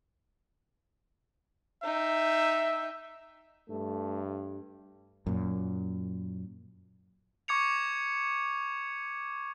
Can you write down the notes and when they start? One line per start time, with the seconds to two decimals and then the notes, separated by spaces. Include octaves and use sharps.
1.83 D#4 E5 G5
3.70 G2 A3
5.26 F#2 A#2
7.48 C#6 D6 G#6 C#7 F7